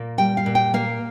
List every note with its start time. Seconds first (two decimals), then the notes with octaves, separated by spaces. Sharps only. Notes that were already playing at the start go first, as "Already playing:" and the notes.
Already playing: A#2 A#3
0.18 G3 G5
0.37 F5
0.46 A#2
0.55 G5
0.74 A#3 F5